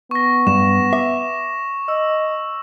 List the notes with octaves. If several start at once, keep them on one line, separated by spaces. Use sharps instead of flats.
B3 C#6 A#6
G2 E7
E5 D6
D#5 E6